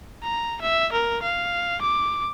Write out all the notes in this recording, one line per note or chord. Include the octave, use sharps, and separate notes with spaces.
A#5
E5
A#4
F5
D6